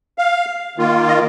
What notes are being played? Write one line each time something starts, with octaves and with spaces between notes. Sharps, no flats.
F5
D#3 A#3 F4
D#5